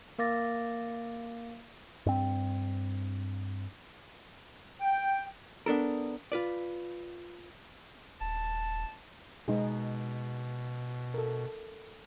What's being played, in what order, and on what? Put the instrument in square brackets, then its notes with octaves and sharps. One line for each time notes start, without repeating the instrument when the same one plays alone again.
[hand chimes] A#3 A#4 F5 D6 A6 A#6
[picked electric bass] G2 C4
[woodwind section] G5
[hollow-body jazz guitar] B3 D4 A4 A#4
F4 B4 D5
[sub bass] D#1 [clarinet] A5
[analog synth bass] B2 [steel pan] G#3 D#4 G#4
[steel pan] A4 A#4